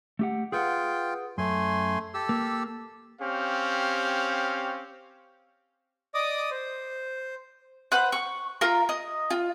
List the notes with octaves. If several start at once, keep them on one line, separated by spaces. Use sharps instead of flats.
A3 G4 F#5
F4 G#4 B4 F#5 G5
F#2 A3 G#5 C6
G4 A4 E6
A#3
C4 C#4 G4 F5
D5 D#5 D6 D#6
C5
B4 C5 F#5
C#6
F4 A#4
D#5
F4